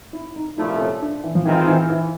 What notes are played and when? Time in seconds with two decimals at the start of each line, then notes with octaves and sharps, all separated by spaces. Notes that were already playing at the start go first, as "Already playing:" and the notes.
0.13 E4
0.36 D#4
0.57 C2 A#2 F3 A3 E4
0.79 C#4
1.01 D4
1.24 E3
1.35 F3
1.45 D#3 E3 G#3 C4 F4
1.67 E3
1.90 E3